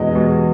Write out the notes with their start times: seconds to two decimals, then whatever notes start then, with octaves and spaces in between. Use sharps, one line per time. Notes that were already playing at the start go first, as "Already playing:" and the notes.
Already playing: E2 B2 G#3 D#5
0.15 B2 G#3